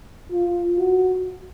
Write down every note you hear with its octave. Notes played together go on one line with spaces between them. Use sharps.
F4
F#4